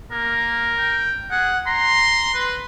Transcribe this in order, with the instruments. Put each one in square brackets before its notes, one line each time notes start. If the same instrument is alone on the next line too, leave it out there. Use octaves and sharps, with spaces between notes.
[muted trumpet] A#3 [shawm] A#4
[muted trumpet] G5
[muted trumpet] G#4 [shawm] F#5
[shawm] A#5 [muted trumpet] C6
[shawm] B4